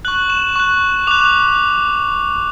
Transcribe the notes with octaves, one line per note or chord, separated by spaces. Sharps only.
C#6 F#6 F#7
E7
C#6 F#6
D6 F#6 F7